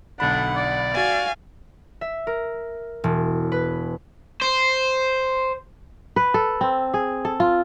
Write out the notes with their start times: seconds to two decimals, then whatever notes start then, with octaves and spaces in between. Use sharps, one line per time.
0.20 B1 D3 D4 F#5 B5
0.56 D5
0.94 F#4 F5 G#5 A6
2.01 E5
2.27 A#4
3.04 E1
3.52 B4
4.41 C5
6.16 B4
6.34 A4
6.61 C4
6.94 G#4
7.25 A4
7.40 F4